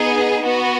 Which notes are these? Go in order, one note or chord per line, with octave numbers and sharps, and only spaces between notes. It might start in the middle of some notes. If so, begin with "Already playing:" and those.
Already playing: B3 D#4 G#4
B3 F#4